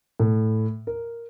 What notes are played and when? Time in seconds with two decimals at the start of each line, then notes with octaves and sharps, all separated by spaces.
0.20 A2
0.87 A#4